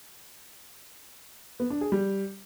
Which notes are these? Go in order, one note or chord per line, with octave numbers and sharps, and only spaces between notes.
B3
D4
G#4
G3